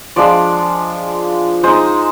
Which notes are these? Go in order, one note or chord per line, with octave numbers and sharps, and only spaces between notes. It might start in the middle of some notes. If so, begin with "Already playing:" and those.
F3 G#3 D4 F4 D5
G#3 D#4 C5